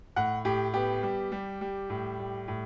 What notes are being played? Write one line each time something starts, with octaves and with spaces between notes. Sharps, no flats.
A2 F#5
A2 G4
B3 G4
G3
G3
G3
A2
G3
A2